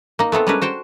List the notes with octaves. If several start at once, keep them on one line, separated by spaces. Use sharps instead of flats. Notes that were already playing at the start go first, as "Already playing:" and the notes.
A#3 D#4
A3 B3 C4 A4
G3 G#3 C#4 D4 A#4 B4
F#4 C5 G5 A5